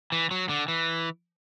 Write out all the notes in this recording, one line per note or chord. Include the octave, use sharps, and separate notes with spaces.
E3
F#3
D3
E3